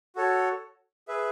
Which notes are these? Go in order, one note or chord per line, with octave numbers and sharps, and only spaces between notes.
F#4 A4 C#5
G#4 B4 E5